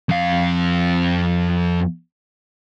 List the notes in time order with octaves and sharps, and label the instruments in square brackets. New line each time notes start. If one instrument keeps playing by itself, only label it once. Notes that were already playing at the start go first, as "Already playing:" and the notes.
[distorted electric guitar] F2 F5